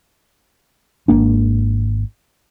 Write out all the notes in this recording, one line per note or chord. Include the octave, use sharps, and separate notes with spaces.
G#1 A#3 D4